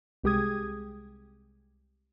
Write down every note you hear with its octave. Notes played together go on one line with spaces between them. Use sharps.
C2 G#3 G4 G#4 D#6 G#6